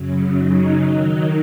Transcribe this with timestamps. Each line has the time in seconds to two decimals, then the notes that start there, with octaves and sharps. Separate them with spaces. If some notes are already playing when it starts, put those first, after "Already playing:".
Already playing: F#2 C#3 F#3
0.37 C#3 F#3 D#4
0.82 D#3 F#3 D#4